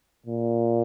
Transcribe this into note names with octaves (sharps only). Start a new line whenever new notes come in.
A#2